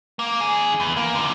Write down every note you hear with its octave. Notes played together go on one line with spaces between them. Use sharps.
A#3
D#3 G#4
E2
A#3
D3 F3